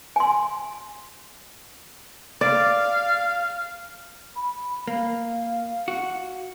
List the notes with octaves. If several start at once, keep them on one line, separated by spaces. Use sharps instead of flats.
G#5 C6
D5 F5
B5
A#3 F5
F#4